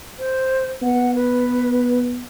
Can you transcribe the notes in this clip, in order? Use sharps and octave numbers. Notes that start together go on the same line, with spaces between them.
C5
B3 F#5
B4